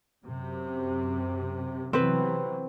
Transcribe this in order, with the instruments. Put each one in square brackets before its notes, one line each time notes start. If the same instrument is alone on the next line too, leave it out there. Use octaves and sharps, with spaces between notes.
[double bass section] F#2 C3
[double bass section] C3 E3 F#3 [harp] C4 B4